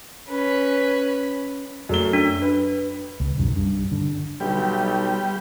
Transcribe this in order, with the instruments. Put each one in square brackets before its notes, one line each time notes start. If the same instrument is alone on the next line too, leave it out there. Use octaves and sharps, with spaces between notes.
[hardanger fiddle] C#4 B4
[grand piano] F#2 A3 G7
[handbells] D4
[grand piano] B4
[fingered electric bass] C#2
B1 F#2
G2
D3
[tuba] B1 [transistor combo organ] G3 G4